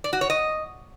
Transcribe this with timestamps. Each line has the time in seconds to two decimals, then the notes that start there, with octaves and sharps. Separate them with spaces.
0.04 D5
0.13 F#4
0.21 C#5
0.30 D#5